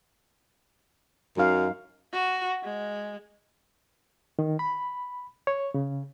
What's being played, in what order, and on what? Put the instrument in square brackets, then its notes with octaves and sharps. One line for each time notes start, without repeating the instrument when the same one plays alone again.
[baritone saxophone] F#2 [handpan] F#3 D#4 F5
[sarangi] F#4
G#3
[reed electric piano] D#3
B5
C#5
C#3